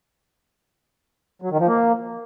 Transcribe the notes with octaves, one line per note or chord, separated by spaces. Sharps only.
F#3
D#3
F3
A#3